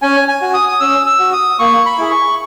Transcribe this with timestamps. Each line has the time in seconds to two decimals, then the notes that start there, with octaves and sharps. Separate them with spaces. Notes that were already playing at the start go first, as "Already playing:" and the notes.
0.02 C#4 G#5
0.28 G#5
0.42 F#4
0.54 D#6
0.69 D#6
0.80 C#4 E6
1.06 E6
1.19 F#4
1.33 D#6
1.59 A#3 C#6
1.86 B5
1.98 E4 G#4
2.11 C#6